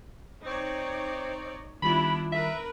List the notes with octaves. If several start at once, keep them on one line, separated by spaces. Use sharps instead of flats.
C4 D#4 C#5 D5
D#3 G3 B3 D4 E4 F4 B5
A#4 B4 E5